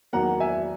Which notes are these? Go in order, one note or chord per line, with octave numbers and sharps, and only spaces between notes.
E1 E2 D#3 F#3 A#3 F#5 A#5
E5 G#5